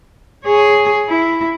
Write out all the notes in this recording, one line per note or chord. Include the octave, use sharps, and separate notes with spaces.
G#4 C#5
E4